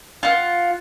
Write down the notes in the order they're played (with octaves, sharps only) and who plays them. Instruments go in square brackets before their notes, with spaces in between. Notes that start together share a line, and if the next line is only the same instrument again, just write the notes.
[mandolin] F4 F#5